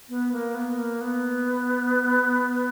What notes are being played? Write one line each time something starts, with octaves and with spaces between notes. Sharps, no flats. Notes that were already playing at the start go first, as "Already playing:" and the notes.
B3
A#3
B3
A#3
B3